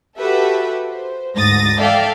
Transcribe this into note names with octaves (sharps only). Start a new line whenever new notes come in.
F#4 G4 A4 B4 E5 F#5
C5
D2 G#2 D#6 A6 A#6
A4 D5 E5 F5 G5 A5